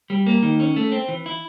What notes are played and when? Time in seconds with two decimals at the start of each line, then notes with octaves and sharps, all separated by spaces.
0.10 G3
0.26 A#3
0.42 D#3
0.60 C#4
0.76 A3
0.92 C4
1.08 E3
1.26 E4